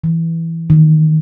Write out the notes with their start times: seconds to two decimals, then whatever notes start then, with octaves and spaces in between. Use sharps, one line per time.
0.04 E3
0.70 D#3